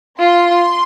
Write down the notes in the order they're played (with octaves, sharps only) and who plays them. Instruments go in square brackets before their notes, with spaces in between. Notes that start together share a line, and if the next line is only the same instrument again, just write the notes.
[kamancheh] F4 [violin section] C6